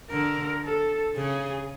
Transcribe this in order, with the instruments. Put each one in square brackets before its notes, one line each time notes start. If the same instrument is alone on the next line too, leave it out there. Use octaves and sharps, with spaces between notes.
[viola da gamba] D3 [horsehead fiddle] A#4
[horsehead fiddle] A4
[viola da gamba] C#3 [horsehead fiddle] G#4